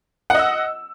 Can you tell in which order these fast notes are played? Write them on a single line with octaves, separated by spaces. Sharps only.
F#5 D#5 E6